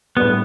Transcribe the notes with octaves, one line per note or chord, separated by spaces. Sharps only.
A2 G3 B3 D4 G4